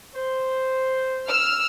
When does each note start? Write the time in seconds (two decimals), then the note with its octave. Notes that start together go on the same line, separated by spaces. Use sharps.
0.16 C5
1.27 E6 F6